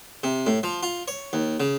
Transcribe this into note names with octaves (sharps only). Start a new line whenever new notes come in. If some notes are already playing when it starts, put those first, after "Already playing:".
C3
A2
F3
F4
C#5
D#2
C#3